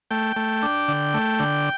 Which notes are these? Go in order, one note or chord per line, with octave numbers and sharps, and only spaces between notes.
A3 G5
A3
D4
D3
A3
D3